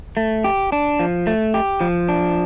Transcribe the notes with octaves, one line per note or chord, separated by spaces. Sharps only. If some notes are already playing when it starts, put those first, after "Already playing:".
A3
G4
D4
F3
A3
G4
F3
D4